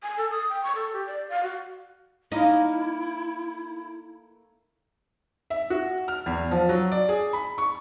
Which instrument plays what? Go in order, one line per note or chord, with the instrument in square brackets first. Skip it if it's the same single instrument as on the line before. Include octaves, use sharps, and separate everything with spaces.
[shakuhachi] G#5
A4
D#6
G5
C#6
A4
G4
D5
F5
F#4
[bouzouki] A3 A#3 F5 [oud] D#4 [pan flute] E4
[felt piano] E5
F#4
F6
E2
F3
F#3
D5
G#4
B5
C#6